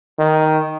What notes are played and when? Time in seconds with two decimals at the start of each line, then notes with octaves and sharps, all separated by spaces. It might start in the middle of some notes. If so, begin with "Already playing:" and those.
0.19 D#3